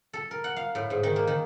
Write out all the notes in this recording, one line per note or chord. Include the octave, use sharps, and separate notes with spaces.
A4
A#4
F#5
F5
A2
G#2
D#3
A#3
D#3